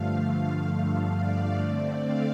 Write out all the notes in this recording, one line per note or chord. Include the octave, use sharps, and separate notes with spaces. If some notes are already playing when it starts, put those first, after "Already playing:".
Already playing: G2 D3 F3 A3 F5
D5
D3 A3 C4
F5